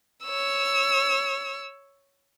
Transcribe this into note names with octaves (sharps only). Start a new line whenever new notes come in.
C#5 E6